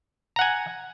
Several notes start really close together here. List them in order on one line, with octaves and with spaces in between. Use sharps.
A#5 F#5 G#5